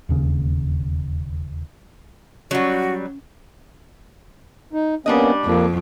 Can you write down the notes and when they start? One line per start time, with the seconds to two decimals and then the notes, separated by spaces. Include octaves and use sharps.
0.09 E1 D#2 C#3
2.51 F#3 G3 C#4 F#4 C#6
4.73 D#4
5.06 G3 A#3 B3 C#4 D4 D#5
5.44 F2 A#3